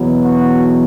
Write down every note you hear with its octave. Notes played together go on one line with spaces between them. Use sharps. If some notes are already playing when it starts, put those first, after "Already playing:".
Already playing: E2 B2 F#3 B3
F#4